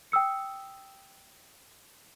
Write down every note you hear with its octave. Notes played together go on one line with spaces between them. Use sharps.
G5 D#6 E6 C#7